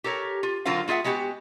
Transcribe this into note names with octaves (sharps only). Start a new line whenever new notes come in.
G4 A4 A#4 C#5
F4
D3 F#3 F4 A#4 C5 F5
A#3 F4 G#4 E5 F#5
G#3 B3 F#4 G4